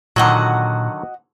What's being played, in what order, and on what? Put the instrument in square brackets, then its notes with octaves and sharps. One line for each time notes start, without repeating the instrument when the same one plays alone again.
[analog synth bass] A#2 [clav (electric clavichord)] D3 D#3 F#3 [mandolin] F#4 D#5 F#5